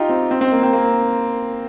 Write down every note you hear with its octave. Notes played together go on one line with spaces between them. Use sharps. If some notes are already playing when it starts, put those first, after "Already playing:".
Already playing: D#4 F4 G4
C4
C4
C4
A#3
C4
A#3